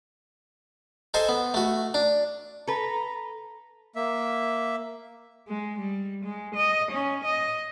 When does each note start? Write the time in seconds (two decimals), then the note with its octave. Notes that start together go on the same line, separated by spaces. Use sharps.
1.14 A4 C5 D#5 G#5
1.29 B3
1.54 A3 F#4
1.94 D4
2.67 A4 B4 A#5
3.96 A#3 E5
5.48 G#3
5.78 G3
6.24 G#3
6.55 D#5
6.91 C#4
7.24 D#5